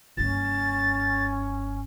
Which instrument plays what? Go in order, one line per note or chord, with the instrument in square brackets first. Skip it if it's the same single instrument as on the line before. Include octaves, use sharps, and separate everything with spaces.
[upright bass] F#1 G2 [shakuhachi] C#4 [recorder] A6